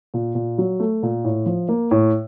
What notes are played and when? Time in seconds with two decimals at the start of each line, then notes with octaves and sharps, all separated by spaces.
0.14 A#2
0.35 A#2
0.58 F#3
0.80 A3
1.03 A#2
1.24 A2
1.46 F3
1.69 A#3
1.91 A2